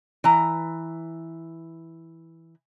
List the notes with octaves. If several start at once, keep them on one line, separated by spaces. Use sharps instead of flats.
E3 A#5